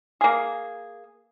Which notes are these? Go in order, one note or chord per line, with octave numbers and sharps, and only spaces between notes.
A#3 G#4